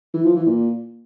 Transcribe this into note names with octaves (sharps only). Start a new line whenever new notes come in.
E3
F3
E3
A#2